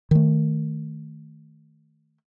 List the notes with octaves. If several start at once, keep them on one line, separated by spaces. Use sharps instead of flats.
D#3 A3